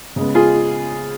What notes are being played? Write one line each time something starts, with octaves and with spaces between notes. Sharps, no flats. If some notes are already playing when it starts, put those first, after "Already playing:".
C#3 G#3 B3
F4 G#4